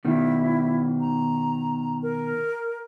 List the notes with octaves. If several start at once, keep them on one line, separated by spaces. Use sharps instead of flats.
B2 D#3 E4
A#5
A#4